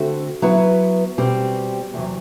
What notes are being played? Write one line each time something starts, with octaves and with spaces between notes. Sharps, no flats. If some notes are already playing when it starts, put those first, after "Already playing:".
Already playing: D3 A3 C4 F#4
F#3 B3 E4 B4
B2 G3 C4 G4
E2 C3 F#3